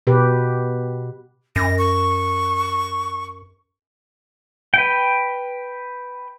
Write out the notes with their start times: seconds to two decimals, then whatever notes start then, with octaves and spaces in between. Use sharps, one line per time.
0.07 B2 G4 B4
1.56 F#2 A#6
1.78 C#6
4.74 B4 G5